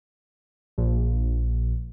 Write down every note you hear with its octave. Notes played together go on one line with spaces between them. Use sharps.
A#1